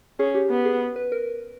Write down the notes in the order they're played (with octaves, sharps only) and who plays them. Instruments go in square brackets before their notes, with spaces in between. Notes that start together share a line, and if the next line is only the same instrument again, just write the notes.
[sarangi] C#4 [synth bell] G#4
[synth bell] G4
[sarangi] B3
[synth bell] G#4
B4
A#4